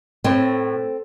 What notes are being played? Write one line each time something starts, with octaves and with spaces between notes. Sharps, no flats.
A2 C4